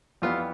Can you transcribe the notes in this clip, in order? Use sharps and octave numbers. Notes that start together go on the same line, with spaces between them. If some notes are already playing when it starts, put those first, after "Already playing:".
F2 E3 G3 B3 F4